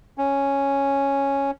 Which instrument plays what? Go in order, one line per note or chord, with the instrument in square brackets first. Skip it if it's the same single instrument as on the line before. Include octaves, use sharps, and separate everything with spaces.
[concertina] C#4